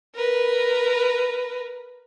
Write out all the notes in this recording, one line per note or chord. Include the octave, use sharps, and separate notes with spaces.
A#4 B4